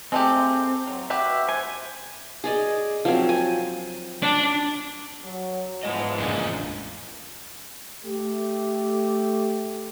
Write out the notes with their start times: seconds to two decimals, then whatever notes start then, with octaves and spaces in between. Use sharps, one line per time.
0.12 G#3 A3 C4 G4
0.87 F#3
1.10 F#4 G4 B4 E5
1.49 C5 G#5
2.44 G#4 D5 D#5
3.05 F3 F#3 C4
3.29 G#5
4.22 D4
5.24 F#3
5.83 G#2 E3 F3 G#3 B3 D#5
6.18 A1 F2 A#2 C#3 D4 E4 F4
8.04 A3 G4